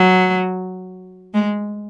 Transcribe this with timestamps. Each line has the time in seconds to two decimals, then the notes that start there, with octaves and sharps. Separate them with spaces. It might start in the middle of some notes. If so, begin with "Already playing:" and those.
Already playing: F#3
1.34 G#3